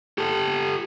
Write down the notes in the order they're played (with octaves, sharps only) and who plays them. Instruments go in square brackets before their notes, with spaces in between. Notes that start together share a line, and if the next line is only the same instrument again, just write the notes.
[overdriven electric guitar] G4 A4